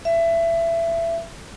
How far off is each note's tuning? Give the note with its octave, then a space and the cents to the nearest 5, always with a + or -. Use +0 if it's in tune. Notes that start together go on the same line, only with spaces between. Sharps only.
E5 +20